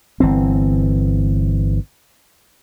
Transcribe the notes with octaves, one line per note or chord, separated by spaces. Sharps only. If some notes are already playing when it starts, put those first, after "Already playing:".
G1 E3 C4